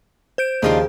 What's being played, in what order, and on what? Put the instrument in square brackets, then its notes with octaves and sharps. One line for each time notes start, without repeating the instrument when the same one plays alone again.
[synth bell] C5 G6 D7
[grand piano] D#2 [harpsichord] C#3 F3 [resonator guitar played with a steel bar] D4 D#4 F4